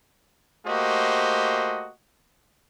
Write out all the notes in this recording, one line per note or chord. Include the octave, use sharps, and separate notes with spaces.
A3 A#3 F#4 G4 C5 D#5